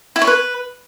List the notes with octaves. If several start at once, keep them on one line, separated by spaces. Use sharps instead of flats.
E4
C#5
B4